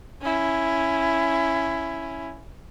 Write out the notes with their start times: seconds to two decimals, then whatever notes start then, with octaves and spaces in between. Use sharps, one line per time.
0.22 C#4 E4